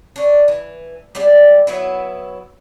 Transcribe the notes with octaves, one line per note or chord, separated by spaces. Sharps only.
C#4 D4
E3
G3 G#3 C4 D5
F#3 B3 E4